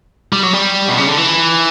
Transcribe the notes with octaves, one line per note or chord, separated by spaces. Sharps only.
G3
F#3
G3
B2
C#3
D3
E3